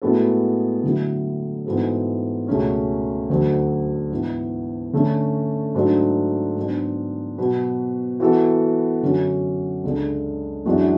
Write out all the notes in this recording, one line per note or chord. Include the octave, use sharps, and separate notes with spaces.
A2 G#3 B3 F#4 A4
D3 F#3 A3 E4
G#2 E3 B3 F#4 A4
C#2 B2 A3 C#4 G#4
D2 D3 F#3
G#2 E3 B3
D3 A3 C#4
G#2 F#3 A3 D4
G#2 F#3 B3 D4
B2 F#3 B3 F#4 B4
E3 B3 F#4 A4
F#2 D3 F#3 C#4 F#4
C#2 C#3 G#3 D4 A4
F#2 E3 G#3 D4 F#4